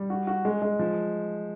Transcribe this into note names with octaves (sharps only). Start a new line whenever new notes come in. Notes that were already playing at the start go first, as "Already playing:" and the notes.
Already playing: G3
F#4
F#4
G#3
G#3
F3